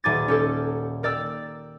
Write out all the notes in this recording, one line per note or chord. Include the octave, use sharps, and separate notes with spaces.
D#1 D#4 G#5 D6 G#6 A6
C#4 G4 A4
A#4 D5 G5 E6